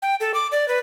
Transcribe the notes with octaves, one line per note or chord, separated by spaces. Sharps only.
G5
A4
D6
D5
B4